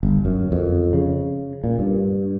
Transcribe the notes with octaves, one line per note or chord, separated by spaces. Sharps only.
G1
F#2
F2
C#3
A#2
G2